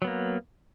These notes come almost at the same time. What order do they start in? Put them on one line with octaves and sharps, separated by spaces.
F#3 B3 A#3